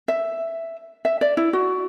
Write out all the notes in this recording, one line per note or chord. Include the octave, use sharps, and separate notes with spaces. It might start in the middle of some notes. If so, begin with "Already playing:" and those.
E5
E5
D5
E4
F#4